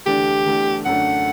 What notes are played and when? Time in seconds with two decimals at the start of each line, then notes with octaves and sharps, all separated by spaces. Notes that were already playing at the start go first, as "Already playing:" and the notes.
0.06 E2 D3 A3 D4 G4
0.46 E2 D3 A3 D4
0.86 F#2 D3 A3 D4 F#5